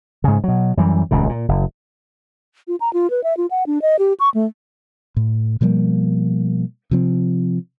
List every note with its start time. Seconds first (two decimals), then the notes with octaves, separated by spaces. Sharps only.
0.24 G#2 C#3
0.44 B2 F#3
0.77 F#2 E3 G3
1.11 D#1 C#2 C#3
1.29 A#2
1.48 F#1
2.68 F4
2.81 A#5
2.93 F4
3.10 B4
3.24 E5
3.37 F4
3.51 F#5
3.67 D4
3.82 D#5
3.99 G4
4.20 C#6
4.34 A3
5.17 A2
5.61 B2 F3 G3 A#3
6.91 C3 F3 C4